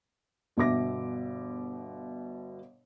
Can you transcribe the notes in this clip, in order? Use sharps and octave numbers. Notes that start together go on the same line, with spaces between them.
G1 B2 E5 D6 A#6